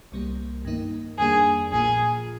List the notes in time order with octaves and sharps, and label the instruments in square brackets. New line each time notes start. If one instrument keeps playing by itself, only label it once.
[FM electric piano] C2 C3 G3 A#3
G2 D#3 A#3 D#4
[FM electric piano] F2 D#3 G3 A#3 D4 [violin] G#4
[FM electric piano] A#1 A#2 F3 A#3 F4 [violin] G#4